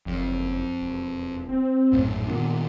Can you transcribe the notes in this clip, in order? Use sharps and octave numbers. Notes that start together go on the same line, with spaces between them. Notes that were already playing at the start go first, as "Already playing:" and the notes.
F#1 F2
E1
C4
A#1 F#2 A2
A#2 D#3 B3 D4